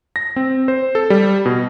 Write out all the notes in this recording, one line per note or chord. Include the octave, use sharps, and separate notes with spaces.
A#6
C4
C5
A4
G3
B2